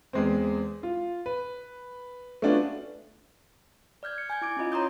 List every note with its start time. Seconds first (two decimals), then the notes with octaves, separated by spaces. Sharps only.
0.13 E2 G#3 C4
0.83 F4
1.26 B4
2.42 A3 B3 C#4 D4 F4 F#4
4.03 D5 F6 G6 G#6
4.18 C#7
4.30 G#5 G6 G#6
4.41 E4 D6 D7
4.57 C#4 E4 F4 D#5
4.72 C#5 A#5 C6 D#6 G6